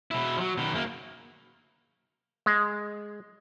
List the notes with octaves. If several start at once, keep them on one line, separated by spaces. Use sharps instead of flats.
B2 E4
F3 F#3
B2 D#3
F#2 A#3
G#3